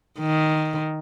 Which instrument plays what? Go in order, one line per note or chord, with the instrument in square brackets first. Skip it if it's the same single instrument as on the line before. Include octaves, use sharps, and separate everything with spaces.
[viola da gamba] D#3